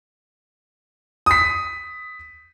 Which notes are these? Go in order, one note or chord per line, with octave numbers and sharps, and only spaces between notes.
D#6 B6